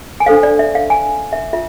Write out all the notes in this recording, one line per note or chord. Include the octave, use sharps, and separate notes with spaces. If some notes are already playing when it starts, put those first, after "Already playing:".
G#5
D4 A4 C5 F5
D5
E5
F5
G#5
E5
F4 E5